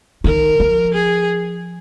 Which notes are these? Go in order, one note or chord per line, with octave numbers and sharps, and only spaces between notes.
D#3 A#4
F3
G#4